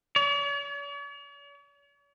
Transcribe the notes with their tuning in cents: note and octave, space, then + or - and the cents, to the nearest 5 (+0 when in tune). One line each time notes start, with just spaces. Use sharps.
C#5 +45